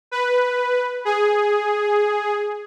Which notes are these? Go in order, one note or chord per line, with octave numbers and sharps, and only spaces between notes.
B4
G#4